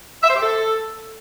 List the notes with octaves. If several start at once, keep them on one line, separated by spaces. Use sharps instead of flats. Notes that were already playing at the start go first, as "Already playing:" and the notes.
E5
C5
G4
A4